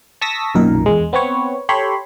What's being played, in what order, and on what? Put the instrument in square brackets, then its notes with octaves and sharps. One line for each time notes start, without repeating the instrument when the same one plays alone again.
[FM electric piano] A5 C#6 D#6 E6 A#6 B6
B1 F#2 A#2 D#3 A#4
E2 G#3
B3 C4 B4 C#5
G4 A4 C#5 B5 C6